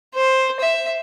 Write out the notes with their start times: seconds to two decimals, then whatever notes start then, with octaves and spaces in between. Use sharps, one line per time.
0.15 C5
0.60 E5